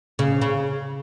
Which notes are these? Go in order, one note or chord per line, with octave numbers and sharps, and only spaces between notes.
C#3
C#3